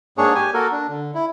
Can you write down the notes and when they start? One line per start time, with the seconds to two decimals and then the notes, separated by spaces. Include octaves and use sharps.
0.18 G#2 A#3 D4 G#4 C#5
0.35 G4 G#5
0.54 A#3 F#4 A4 A#4
0.72 D4
0.88 D3
1.14 E4